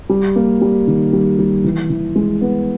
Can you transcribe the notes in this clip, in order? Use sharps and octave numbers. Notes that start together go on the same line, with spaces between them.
G3
A#3
G3
D#3
G3
G3
E3
E3
G#3
B3